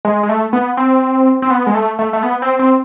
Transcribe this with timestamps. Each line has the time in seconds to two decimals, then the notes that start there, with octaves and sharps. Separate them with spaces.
0.05 G#3
0.23 G#3
0.29 A3
0.53 B3
0.77 C4
1.42 C4
1.50 B3
1.67 G#3
1.75 A3
1.99 A3
2.13 A3
2.23 B3
2.42 C4
2.59 C4